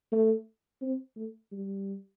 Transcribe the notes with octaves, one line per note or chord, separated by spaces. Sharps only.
A3
C4
A3
G3